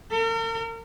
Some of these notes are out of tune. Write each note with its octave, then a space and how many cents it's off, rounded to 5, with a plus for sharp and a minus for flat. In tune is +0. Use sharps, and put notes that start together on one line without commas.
A#4 -45